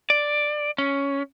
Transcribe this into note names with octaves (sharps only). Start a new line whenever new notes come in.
D5
C#4